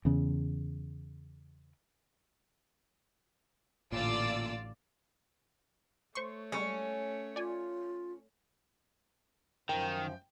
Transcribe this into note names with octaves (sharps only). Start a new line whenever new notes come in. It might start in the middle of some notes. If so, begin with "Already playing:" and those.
E2 C#3
A1 A#2 D3 F4 D5 E6
A3 C5 C#5 C6 C#6
G3 G#3 C#4
F4 D5 G#5
F#2 D#3 F3 G5